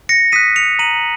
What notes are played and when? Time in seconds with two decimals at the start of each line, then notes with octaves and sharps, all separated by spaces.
0.09 A#6 C#7
0.32 D#6 F#6 B6 D#7
0.56 C#7 F7
0.79 A#5 D#7 F#7